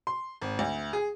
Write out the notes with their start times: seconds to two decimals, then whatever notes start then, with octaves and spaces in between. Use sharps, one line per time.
0.07 C6
0.42 G#1
0.59 D2
0.93 G#4